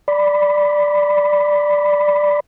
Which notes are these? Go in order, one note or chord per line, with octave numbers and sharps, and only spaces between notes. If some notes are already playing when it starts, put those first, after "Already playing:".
D5 B5